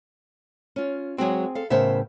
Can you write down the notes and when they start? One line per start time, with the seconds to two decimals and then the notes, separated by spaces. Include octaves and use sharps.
0.76 C#4 F4
1.18 F#3 G#3 C4 F#4 G#4
1.55 A4 F5
1.70 A2 C#3 B3 A#4 C5 E5